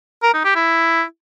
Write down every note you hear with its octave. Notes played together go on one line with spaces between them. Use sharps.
A#4
D#4
G4
E4